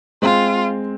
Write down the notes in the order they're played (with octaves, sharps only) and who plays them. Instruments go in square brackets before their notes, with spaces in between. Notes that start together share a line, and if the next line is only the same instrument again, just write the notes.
[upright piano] G#3 C4 [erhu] F4